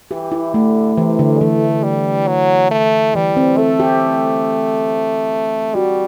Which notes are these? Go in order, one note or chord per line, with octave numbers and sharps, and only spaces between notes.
E3 G4
E4
D3 A3
C3 E3
D3
E3 A3
G3
F#3
A3
E3 G3
C4
A3 A4
G4
G3 F#4